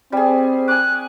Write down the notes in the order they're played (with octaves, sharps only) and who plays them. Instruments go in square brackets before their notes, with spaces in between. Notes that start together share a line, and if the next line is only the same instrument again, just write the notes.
[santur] G3 G#4 [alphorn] C4
[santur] G#5 D6 [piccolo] F#6